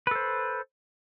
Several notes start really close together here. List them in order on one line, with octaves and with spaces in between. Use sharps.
B4 A4 C5